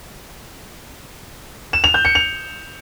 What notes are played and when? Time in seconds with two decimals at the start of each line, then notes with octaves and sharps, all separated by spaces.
1.73 E7
1.84 F7
1.94 G6
2.05 C#7
2.15 F7